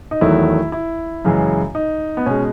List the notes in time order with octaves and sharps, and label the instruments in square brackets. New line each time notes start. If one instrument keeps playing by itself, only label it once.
[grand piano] D#4
E2 D#3 F#3 A3 E4
E4
F#2 C#3 E3 G#3
D#4
B3
B2 G#3 C#4